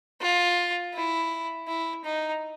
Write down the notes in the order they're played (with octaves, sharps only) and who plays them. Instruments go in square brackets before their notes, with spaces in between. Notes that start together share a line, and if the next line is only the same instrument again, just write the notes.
[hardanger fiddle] F4
E4
E4
D#4